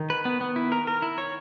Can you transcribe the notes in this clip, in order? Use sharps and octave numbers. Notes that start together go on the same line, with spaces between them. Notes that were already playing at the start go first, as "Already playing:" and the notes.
Already playing: D#3
B4
B3
B3
E4
A#4
A#4
E4
C#5